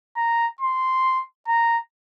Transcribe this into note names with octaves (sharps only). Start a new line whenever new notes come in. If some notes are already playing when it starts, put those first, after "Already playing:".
A#5
C6
A#5